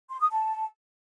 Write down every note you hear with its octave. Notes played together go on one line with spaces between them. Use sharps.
C6
D#6
A5